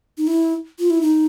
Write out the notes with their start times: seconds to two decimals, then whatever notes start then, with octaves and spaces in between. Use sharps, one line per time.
0.18 D#4
0.27 E4
0.79 F4
0.90 E4
1.01 D#4